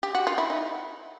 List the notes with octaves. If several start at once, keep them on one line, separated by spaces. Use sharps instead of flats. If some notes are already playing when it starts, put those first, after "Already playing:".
G4
F#4
F4
E4
D#4